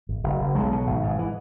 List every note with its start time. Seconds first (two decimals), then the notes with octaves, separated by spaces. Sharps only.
0.09 G#1
0.24 F#1
0.39 F#1
0.55 B1 G#3
0.72 B2
0.87 G#1
1.03 G#2
1.19 E3